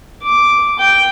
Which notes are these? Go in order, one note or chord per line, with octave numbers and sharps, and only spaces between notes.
D6
G5